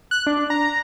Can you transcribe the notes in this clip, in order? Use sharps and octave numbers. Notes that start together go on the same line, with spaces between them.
F#6
D4
A#5